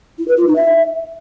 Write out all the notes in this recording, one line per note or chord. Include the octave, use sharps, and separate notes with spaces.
E4
B4
F4
D#4
E5